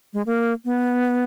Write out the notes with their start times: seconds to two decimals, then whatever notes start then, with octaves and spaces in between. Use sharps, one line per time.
0.13 G#3
0.26 A#3
0.65 B3